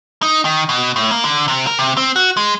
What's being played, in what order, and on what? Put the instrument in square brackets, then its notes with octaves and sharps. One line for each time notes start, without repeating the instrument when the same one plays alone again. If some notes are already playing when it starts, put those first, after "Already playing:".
[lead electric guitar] D#4
D#3
B2
A2
A#3
D3
C3
A#4
C3
C4
F#4
G#3